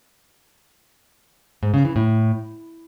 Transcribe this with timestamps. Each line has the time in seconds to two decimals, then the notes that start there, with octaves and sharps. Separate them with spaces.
1.63 G#2
1.74 C#3
1.85 E3
1.96 A2